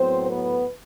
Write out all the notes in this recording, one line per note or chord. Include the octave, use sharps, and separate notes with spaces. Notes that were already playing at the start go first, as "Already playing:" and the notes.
Already playing: A2 F#3 B3 C4 C5
B3 B4